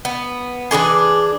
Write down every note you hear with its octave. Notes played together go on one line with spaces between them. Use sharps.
B3
E3 D4 G4 G#4